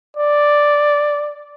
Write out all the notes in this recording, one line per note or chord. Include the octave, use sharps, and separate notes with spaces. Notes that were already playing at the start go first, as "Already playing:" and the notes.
D5